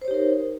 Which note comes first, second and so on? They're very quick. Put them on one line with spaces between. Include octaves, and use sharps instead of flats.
C5 C#5 G4 D#4 A#4